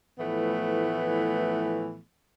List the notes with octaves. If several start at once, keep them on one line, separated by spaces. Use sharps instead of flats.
A2 E3 F3 A3 B3